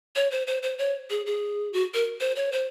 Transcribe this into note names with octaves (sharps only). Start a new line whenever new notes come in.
C#5
C5
C5
C5
C#5
G#4
G#4
F#4
A#4
C5
C#5
C5